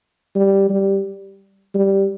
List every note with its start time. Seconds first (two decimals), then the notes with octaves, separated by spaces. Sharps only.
0.36 G3
0.70 G3
1.75 G3